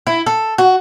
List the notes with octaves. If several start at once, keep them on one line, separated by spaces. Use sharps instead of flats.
E4
A4
F#4